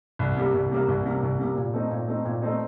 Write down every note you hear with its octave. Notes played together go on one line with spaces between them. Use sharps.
C2
C3 G3 A#3
C2
C3 G3 A#3
C2
C3 G3 A#3
C2
C3 G3 A#3
A#2
A3 C4 D#4
A#2
A3 C4 D#4
A#2
A3 C4 D#4